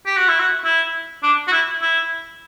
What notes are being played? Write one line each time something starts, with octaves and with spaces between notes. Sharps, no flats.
G4
F#4
E4
F#4
E4
D4
F#4
E4
E4